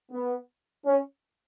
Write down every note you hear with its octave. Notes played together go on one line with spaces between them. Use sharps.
B3
C#4